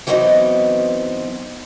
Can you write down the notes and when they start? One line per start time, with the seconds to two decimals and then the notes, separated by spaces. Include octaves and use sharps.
0.07 E3 F#3 B3 C4 D#4